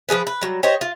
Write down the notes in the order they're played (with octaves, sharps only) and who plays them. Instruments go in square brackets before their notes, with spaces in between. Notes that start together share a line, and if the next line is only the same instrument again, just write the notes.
[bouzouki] F3 G3 G#4 B4
B4
F#3 G3
G4 C5 C#5 D#5
F4